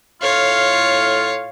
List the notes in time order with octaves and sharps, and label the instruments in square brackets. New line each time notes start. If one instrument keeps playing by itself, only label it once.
[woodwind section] A2 F4 [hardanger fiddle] C#5 F5